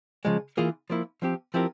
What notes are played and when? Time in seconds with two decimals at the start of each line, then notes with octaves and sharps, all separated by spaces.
0.25 C#3 F3 G#3
0.57 E3 A#3 F4 G#4
0.90 F3 A#3 E4
1.22 F3 C4 G4
1.54 F3 C4 E4 G4 A#4